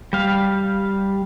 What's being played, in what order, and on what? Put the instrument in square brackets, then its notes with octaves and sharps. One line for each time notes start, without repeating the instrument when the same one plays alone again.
[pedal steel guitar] G3 F5